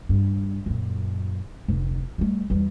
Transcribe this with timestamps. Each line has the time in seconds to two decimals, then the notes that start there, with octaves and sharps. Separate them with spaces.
0.09 G2
0.66 F#2 A#2
1.68 F1 D2
2.18 G3 A3
2.50 E2 G3